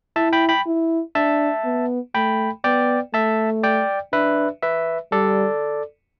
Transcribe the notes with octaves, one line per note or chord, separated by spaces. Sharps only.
E4 E5 A5
G5 B5
G5 B5
E4
D4 E5 A5
B3
A3 G5 B5
B3 D5 G5
A3 E5 A5
D5 G5
D4 B4 E5
B4 E5
G3 A4 D5